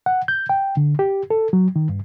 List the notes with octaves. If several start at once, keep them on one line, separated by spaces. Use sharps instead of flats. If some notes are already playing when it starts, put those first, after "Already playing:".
F#5
G6
G5
D3
G4
A4
F#3
D#3
G2